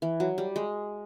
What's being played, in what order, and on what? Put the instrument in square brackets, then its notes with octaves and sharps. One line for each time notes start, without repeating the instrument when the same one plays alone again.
[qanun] E3
F#3
G3
G#3